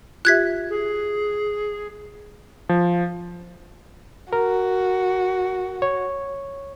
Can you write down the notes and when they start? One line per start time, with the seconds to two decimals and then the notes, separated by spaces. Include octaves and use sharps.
0.25 F4 G4 E5 F#6 G#6 B6
0.70 G#4
2.69 F3
4.33 F#4 A#4
5.82 C#5